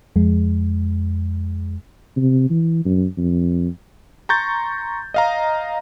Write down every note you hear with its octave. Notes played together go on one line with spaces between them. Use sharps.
F2 G#3
C3
E3
F#2
F2
A#5 C6 C#6 G6 A6
D#5 F5 A#5